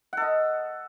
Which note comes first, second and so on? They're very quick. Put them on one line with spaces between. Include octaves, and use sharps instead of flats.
F#5 A4 D#5